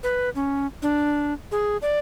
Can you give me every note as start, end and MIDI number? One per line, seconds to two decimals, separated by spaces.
0.03 0.30 71
0.35 0.67 61
0.82 1.33 62
1.52 1.77 68
1.82 1.99 74